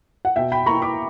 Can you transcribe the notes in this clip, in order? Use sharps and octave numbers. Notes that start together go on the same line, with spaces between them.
F#5
B2 E5 G5
G5 B5
A#3 E4 A#5 C#6
B5 D6